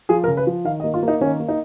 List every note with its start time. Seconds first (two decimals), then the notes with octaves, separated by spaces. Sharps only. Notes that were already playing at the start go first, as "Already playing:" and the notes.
0.09 F3 G#4
0.24 A#4
0.28 C#3
0.37 B4
0.47 F3
0.65 D#3 F5
0.80 D#5
0.84 A#3
0.94 F4
1.03 A#3
1.08 D#4
1.21 D#3 C#4
1.40 A#3
1.49 D#4